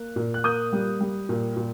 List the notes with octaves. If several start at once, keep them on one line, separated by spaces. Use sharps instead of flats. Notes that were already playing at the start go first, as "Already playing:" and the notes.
Already playing: A#3 F#6
A#2
F#6
A#3 D#6 G6
G3
G3
A#2
A#2